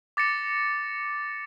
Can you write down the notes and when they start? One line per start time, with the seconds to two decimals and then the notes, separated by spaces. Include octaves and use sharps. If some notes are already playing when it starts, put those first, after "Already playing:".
0.17 D6 A6 A#6 C#7 E7